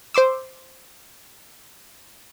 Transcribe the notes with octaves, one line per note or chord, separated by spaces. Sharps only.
C5 C6 D6 E6